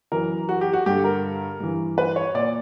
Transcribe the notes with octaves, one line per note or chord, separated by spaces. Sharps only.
F#2 E3 A#4
F#4
G4
F#4
G2 D3 G4
A#4
G2 E3
B4
C#5
A#2 D5